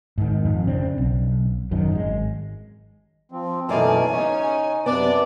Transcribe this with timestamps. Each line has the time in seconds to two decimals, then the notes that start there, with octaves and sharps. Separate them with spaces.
0.18 G#2 D#3
0.45 F2
0.67 C#3 C4 D4
0.98 B1
1.71 F#2 D#3 F#3
1.92 G#1 G#3
3.32 F3 C4
3.69 F#2 B2 E3 A3 A#3 D#4 D5 G#5
4.12 C#3 C#4 D#4 C#5
4.86 F#2 C3 B3 D4 D5